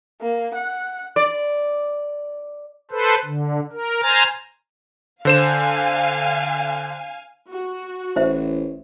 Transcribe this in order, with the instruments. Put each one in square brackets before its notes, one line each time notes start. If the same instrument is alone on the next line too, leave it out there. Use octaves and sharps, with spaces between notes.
[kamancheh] A#3
F#5
[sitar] D5
[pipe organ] A4 B4 C5
D3
A#4
C5 G#5 A#5 F6 A6
[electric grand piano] D3 C5 E7 [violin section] F5 G#5
[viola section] F#4
[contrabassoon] A1 [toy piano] E4 C5 E5